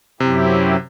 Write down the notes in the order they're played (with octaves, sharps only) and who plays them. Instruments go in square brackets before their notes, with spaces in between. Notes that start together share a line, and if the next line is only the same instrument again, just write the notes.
[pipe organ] F#2 F#3 C4 E4 G4 [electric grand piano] C3